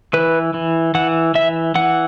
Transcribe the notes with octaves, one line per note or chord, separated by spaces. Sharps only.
E3 B4
E3
E3 F#5
E3 E5
E3 F#5